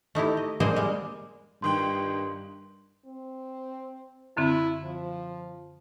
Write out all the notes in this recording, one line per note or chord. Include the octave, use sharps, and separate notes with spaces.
A3 D#4 E4 G4
D#5
G3 A#3 G#4 A#4 C5 D#5
G3 G#3
G1 G2 D#3 G5 C6
C4
F#2 D3 C4 E4
F3